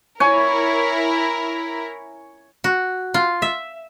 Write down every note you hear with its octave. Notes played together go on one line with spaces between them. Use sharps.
E4 A#4 C#5 G#5
F#4
F4
E5